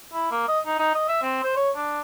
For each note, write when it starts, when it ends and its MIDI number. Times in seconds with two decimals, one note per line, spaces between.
0.13 0.27 64
0.31 0.47 58
0.48 0.60 75
0.66 0.77 63
0.79 0.94 63
0.95 1.08 75
1.08 1.21 76
1.22 1.39 60
1.44 1.54 72
1.56 1.71 73
1.76 2.01 62